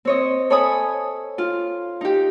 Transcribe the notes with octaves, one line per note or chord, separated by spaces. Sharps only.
C4 C#5 D#5
A4 C#5 G#5 B5 C#6 D#6
F4
D#4 G4